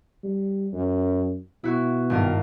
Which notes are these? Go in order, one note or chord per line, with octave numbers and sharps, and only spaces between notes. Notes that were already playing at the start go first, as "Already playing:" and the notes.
G3
F#2
B2 E4 F#4
G#1 G2 A#4